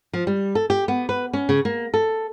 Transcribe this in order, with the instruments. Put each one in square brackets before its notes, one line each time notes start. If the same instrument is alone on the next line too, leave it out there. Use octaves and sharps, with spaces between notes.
[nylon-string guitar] F3
G3
A4
G4
B3
B4
C#4
C#3
A#3
A4